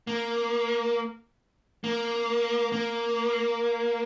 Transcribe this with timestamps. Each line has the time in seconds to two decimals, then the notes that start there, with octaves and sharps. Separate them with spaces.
0.07 A#3
1.84 A#3
2.72 A#3